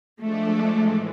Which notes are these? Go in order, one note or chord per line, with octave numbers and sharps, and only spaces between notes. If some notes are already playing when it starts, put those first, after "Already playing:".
F3 G#3 A3 D4 A4 D5
A2 E3 G#3